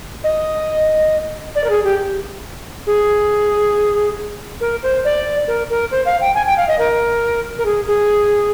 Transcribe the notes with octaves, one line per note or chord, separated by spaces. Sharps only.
D#5
D5
A#4
G#4
G4
G#4
A#4
C5
D5
A#4
A#4
C5
F5
G5
G#5
G5
F5
D#5
A#4
A#4
G#4
G#4